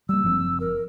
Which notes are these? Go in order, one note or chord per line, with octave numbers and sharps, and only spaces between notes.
G3 A#3 E6
F#1 F3 C4
A#4